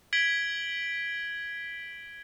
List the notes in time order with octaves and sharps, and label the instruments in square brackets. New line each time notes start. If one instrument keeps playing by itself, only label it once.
[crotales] G#6 B6 D7 F#7 G7